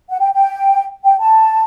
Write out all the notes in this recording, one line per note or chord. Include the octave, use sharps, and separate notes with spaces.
F#5
G5
G5
G5
A5